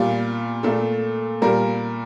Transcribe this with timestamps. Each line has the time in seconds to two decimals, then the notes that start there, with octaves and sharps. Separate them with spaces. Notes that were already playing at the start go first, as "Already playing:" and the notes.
Already playing: A#2 G3 F4
0.63 A#2 A3 A4
1.42 A#2 G3 A#4